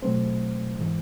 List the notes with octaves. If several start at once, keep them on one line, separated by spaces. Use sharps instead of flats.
B2 F#3 A3 C4 C5
G#2 E3 G#3